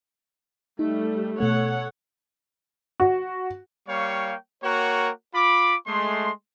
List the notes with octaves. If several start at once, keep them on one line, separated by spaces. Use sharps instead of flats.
G3 A3 D#4
B2 A3 A4 C#5 F#5
F#4
G3 A#3 C#5 F5 G5 C#6
A#3 F#4 A#4 C#5 F#5 G5
F4 B5 D6
G#3 A3 C6